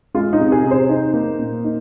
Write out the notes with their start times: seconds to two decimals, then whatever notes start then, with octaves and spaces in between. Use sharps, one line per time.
0.14 G#3 F4
0.33 D#4
0.40 C3
0.52 G#4
0.64 C3
0.71 C5
0.89 D#4
1.14 A#3
1.39 A#2
1.64 D#4